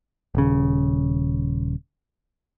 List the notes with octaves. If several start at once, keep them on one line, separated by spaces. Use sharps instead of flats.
D#1 C#3